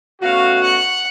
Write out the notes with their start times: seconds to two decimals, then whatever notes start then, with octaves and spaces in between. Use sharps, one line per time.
0.22 B2 A3 C#4 F#4 F5
0.63 F#5